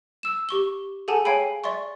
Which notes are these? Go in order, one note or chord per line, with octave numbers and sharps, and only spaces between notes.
E6 E7
G4 C#6 G7
G#4 A4 F#5 G#5 A5
C#5 F5 G5 G#5 B5
D5 E5 C6 C#6